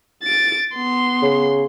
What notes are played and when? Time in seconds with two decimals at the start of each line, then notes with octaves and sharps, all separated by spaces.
0.23 A6 D7
0.75 B3 C6
1.22 C#3